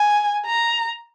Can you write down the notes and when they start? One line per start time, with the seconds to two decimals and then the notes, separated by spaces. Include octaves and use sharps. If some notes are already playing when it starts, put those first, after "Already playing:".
Already playing: G#5
0.46 A#5